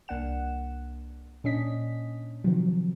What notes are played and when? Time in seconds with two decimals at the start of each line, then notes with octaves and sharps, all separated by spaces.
0.08 C2 A#3 D4 F#5 E7
1.44 A#2 C#4 D4 D#5 B6
2.44 C3 D#3 F3 F#3